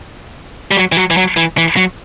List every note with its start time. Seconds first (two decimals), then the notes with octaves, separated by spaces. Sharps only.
0.71 G3
0.77 F#3
0.92 E3
0.97 F#3
1.10 E3
1.17 F#3
1.37 E3
1.58 E3
1.77 F#3